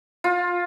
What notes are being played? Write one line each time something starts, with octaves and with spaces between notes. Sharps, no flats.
F4